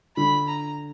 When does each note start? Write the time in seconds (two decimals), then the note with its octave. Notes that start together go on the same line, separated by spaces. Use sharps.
0.16 D3 B5
0.48 A#5